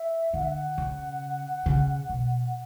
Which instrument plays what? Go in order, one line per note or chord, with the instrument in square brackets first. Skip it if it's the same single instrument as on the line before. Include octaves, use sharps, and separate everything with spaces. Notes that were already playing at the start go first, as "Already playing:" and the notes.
Already playing: [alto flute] E5
[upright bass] D3 [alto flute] F#5
[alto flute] E5
F#5
[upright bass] C#3
C#3
B2